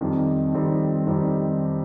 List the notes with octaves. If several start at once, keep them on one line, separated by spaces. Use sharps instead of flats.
F2 D#3 G3 C4 D#4
F2 D#3 G3 C4 D#4
F2 D#3 G3 C4 D#4